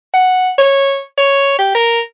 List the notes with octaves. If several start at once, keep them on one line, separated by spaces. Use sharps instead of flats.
F#5
C#5
C#5
G4
A#4